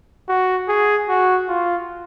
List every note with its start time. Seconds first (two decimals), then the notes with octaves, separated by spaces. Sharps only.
0.29 F#4
0.68 G#4
1.09 F#4
1.48 F4